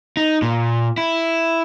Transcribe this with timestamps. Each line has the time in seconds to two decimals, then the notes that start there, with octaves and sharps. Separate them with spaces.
0.17 D#4
0.42 A#2
0.98 E4